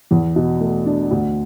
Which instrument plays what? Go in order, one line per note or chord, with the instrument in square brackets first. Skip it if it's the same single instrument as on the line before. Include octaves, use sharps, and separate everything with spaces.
[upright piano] E2
B2
A3
D4
D2